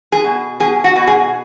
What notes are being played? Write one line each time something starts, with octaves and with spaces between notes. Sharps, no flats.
G#4
B2
B2 G#4
F#4
B2 F#4
G#4